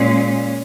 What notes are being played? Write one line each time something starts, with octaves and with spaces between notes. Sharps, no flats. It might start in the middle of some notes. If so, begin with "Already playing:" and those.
Already playing: A#2 G#3 C#4